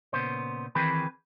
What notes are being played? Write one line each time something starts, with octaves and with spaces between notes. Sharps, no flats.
A#2 C#3 B3 C5
D#3 E3 C4 G#4 B4